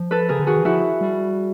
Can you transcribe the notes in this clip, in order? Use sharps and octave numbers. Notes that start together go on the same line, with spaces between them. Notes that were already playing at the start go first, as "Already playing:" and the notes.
Already playing: F3
A4 B4
C#3 G#4 A#4
D3
D#3 F#4 G#4
E3
F3 E4 F#4
G3